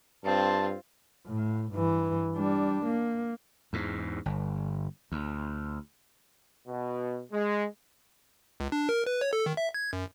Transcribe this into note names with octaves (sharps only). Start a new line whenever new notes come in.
G2 C4 F4 A5
A2
G2 E3
G3 D4
A#3
E2 G#2
G1
D2
B2
G#3
C#2
D4
A#4
B4
C#5
A4
D#3
E5
G#6
F#2